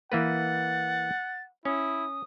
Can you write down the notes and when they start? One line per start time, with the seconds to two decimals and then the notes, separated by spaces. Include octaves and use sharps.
0.12 E3 A#3 B4 F#5 A6
1.65 C#4 E4 D#6